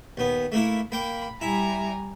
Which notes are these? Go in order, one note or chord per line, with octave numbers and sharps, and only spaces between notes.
D#2 B3
A3 A#3 E4
A#3 G5 B5
G3 E4 G#5 A#5